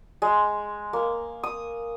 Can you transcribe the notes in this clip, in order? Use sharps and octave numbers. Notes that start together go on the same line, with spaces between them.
G#3
A#3
D#6